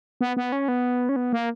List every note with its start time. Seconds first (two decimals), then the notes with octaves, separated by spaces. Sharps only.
0.21 B3
0.37 B3
0.52 C#4
0.68 B3
1.09 C#4
1.16 B3
1.33 A#3